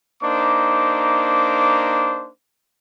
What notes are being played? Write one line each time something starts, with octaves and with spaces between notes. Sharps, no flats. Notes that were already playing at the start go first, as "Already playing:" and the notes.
A#3 D4 D#4 C5 D6